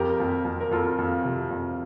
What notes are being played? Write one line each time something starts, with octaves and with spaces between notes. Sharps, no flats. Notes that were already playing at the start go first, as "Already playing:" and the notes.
Already playing: F2 G4 A#4
F2
F2
A#4
F2 F4 A4
F2
C3
F2